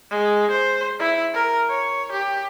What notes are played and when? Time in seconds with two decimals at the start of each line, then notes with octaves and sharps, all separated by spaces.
0.11 G#3
0.51 C5
0.99 E4
1.34 A#4
1.70 C#5
2.12 G4